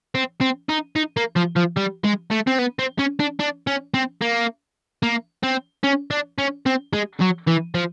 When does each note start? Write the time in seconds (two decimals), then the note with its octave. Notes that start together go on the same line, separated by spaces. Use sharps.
0.15 C4
0.41 C4
0.69 D#4
0.96 D#4
1.17 A#3
1.36 F3
1.57 F3
1.77 G3
2.04 G#3
2.31 A3
2.47 C4
2.59 B3
2.79 C4
2.99 C#4
3.20 D4
3.40 D4
3.67 C#4
3.94 C4
4.22 A#3
5.03 A#3
5.43 C4
5.84 C#4
6.11 D4
6.39 C#4
6.66 C4
6.93 G#3
7.20 F#3
7.47 E3
7.75 F3